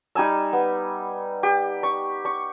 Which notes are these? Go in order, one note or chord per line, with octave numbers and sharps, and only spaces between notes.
G3 D#4 G#5 E6
B3
G4
C#6
C#6